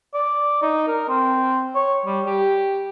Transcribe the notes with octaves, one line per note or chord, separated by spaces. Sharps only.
D5
D#4
A#4
C4
C#5
G3
G4